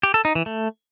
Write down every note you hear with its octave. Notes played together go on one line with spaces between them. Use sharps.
G4
A4
D#4
E3
A3